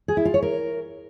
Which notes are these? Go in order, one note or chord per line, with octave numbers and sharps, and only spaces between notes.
G#4
E4
F4
C#5
A#4